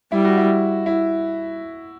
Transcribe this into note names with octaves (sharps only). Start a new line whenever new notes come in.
G3 E4
F#4
E4
E4